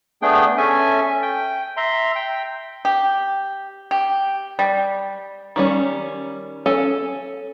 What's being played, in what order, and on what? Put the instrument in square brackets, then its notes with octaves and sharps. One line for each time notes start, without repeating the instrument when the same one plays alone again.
[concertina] A3 B3 D4 G#4 G5
C#4 A4 E5 G#5
G5
E5 A#5 C6
G5
[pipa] G4
G4
G3
[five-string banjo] D#3 G3 C#4
C#4 A4 G#5